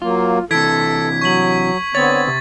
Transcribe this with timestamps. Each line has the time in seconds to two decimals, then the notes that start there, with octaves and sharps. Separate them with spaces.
0.02 F#3 A#3 F4
0.51 C3 E3 A4 G#6 B6 D7
1.21 F#3 C#6 B6 F#7
1.95 D3 B3 C4 C#5 A6
2.27 C3